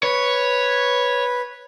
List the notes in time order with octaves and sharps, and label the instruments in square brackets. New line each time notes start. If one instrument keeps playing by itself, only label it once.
[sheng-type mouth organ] B4 [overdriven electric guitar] C#5